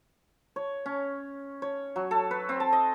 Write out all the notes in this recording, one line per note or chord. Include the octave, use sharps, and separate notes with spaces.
C#5
C#4
C#5
F#3
A4
B4
C4
A5
D#5